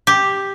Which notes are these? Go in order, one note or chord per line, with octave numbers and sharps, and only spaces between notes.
G4